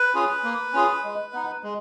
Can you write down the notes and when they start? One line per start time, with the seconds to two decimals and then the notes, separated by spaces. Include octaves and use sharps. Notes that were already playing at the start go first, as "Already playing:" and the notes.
Already playing: B4
0.14 C#4 F4 G#4
0.44 A#3
0.73 C#4 F4 G#4
1.04 G#3
1.33 B3 D#4
1.63 G#3